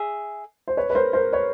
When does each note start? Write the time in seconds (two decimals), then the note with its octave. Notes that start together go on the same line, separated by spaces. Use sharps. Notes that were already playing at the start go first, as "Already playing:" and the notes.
Already playing: G#4 E5
0.68 C5
0.77 B4 C#5
0.90 B4
0.95 A#4 C5
1.13 A#4 C5
1.32 B4 C#5